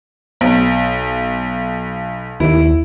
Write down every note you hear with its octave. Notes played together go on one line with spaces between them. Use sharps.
B1
D#2 E4